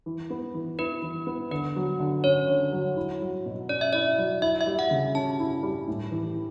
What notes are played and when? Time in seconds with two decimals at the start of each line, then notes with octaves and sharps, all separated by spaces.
0.06 E3
0.30 B3
0.54 E3
0.78 E4 B4
1.03 E3
1.27 B3
1.51 D3 B4
1.76 F#3
1.99 D3
2.24 C#4 C#5
2.48 D3
2.73 F#3
2.96 E4
3.22 F#3
3.46 B2
3.69 C#4 D5
3.81 E5
3.93 E4 D5
4.18 F#3
4.42 E4 E5
4.61 E5
4.67 G3
4.79 F#5
4.91 C#3
5.15 C#4 A5
5.40 E4
5.63 G3
5.88 A2
6.11 E3